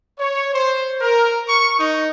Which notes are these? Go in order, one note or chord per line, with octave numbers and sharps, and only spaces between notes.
C#5
C5
A#4
C#6
D#4